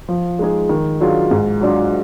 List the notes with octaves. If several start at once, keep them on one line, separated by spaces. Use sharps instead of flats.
F3
G#3 D#4 G#4
D#3
F#3 D4 F4 G#4
G#2
F#3 D4 F4